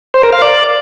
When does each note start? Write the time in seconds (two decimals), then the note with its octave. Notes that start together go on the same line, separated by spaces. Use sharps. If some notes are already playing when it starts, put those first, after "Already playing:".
0.14 C5
0.23 A#4
0.33 F5
0.42 D5